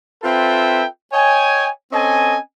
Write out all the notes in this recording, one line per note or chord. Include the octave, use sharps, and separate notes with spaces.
C4 F4 A4 B4 E5 G5
C#5 D#5 G5 G#5
C4 C#4 A4 D#5 G#5